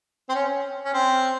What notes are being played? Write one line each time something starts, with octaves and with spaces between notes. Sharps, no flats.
C4
C#4
C#4
C4